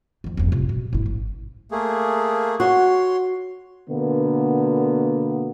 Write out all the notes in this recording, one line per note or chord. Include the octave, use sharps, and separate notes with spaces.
F2 D#3
F#1 F2
C3 F4
B2
G1 E4
G#1
A3 A#3 G#4
F#4 C#5 C6
B2 D3 A#3 B3